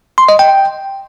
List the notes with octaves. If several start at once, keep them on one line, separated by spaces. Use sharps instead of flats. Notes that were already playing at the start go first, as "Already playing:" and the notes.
C6
D#5
G5